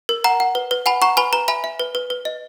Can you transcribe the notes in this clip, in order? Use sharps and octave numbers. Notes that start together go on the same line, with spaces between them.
A#4
F#5 A#5
F#5
B4
B4
F#5 G#5 B5
F#5 A#5 C#6
B4 G#5 B5
B4 A#5
E5 G#5 B5
E5
B4
B4
B4
D#5